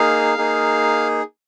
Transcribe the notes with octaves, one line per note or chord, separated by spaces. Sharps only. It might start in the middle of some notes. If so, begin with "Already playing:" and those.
Already playing: A#3 D#4 G#4 F5
A#3 D#4 G#4